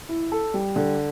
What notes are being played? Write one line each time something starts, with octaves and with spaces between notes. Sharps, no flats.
E4
A4
G3
D3